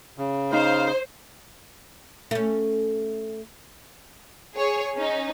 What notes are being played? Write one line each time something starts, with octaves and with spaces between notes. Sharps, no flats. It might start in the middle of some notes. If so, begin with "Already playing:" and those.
C#3
D#4 C5 F5
A3 C#4
G#4 C#5
C#4 D#4